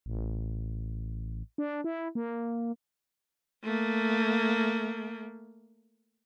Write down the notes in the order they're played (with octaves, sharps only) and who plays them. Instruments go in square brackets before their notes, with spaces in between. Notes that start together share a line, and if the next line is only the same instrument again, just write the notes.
[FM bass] A1
D4
E4
A#3
[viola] A3 A#3